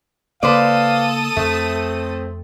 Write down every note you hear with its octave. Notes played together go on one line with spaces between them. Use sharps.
C#3 A#3 A4 B4 C5 D5 F5 D#6
F2 A3 C4